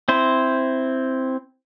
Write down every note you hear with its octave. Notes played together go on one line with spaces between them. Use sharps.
C4 E4 C5